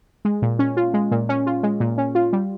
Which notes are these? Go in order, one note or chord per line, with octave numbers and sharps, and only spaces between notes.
G#3
A#2
C#4
F4
G#3
A#2
C#4
F4
G#3
A#2
C#4
F4
G3